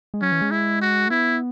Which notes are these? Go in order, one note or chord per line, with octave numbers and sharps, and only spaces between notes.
G#3
F#3 C#4
E3
G#3
E4
F#4
A3
B3 E4